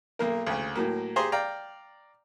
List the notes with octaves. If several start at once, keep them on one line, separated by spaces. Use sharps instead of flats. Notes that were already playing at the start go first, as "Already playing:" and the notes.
B1 A#3 A#4
D2 C#3
A2 F#3 A#3
G4 G#4 C5 A#5 C6
D5 F5 G5 A#5